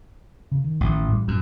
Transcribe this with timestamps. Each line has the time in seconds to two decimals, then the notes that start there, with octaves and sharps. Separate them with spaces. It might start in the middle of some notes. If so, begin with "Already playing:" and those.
0.51 C#3
0.64 D#3
0.81 A1
1.08 A2 G3
1.28 F#2